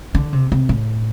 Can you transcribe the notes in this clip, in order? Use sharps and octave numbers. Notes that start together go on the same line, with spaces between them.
D3
C3
C3
A2